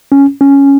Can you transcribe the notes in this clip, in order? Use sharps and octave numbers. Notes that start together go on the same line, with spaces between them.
C#4
C#4